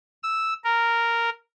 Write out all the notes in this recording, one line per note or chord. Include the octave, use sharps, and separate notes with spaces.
E6
A#4